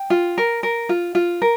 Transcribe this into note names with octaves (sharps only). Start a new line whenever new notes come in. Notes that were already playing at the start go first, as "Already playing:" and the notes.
Already playing: G5
F4
A#4
A#4
F4
F4
A#4